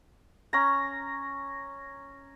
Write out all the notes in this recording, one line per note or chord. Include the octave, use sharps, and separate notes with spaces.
C#4 A#5